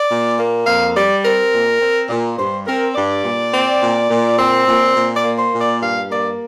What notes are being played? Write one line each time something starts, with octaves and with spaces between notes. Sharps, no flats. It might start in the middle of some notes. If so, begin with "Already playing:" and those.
Already playing: D5
A#2
A#3
F2 F5
G3 D5
C4 A#4
A#2
C4
A#2
G2 C5
C4 A#4
G2 D5
A#2
C4
A#2
A#2
C4
A#2
A#2
D5
A#3
C5
A#2
D5
G2 F5
A#3 D5